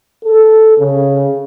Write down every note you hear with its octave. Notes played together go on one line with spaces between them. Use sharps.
A4
C#3